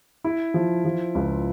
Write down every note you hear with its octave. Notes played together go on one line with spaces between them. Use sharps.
E4
F3
F3
C#2